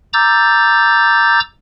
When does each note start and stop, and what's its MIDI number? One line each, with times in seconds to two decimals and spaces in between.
0.13 1.40 82
0.13 1.40 86
0.13 1.40 88
0.13 1.40 91
0.13 1.40 93